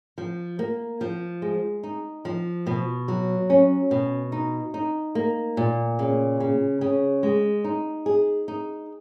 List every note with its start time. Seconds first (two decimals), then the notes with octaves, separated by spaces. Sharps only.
0.18 F3
0.59 A#3
1.01 F3
1.42 G#3
1.83 D#4
2.25 F3
2.67 B2
3.08 F#3
3.50 C#4
3.91 B2
4.32 D#4
4.74 D#4
5.15 A#3
5.57 A#2
5.99 C#3
6.40 C#3
6.81 C#3
7.23 G#3
7.64 D#4
8.06 G#4
8.48 D#4